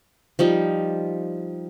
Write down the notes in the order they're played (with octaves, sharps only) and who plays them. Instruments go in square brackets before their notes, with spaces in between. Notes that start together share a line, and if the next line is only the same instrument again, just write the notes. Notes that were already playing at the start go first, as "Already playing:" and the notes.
[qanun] F3 G3 D#4